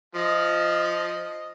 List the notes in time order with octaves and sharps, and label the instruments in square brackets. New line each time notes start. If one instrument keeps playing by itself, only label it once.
[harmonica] F3 [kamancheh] D#5